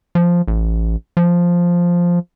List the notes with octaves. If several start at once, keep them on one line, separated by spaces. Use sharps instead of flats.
F3
A1
F3